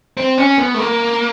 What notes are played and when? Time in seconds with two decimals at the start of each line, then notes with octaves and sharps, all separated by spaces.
0.17 C4
0.38 C#4
0.58 B3
0.74 A3
0.79 A#3